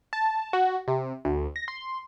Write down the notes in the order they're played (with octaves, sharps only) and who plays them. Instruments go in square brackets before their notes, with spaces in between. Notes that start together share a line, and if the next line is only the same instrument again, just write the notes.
[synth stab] A5
F#4
C3
D2
A#6
C6